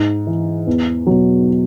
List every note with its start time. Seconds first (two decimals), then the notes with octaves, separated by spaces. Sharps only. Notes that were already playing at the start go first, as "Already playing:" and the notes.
Already playing: G#2
0.27 E3
0.67 E2
1.07 B2 F#3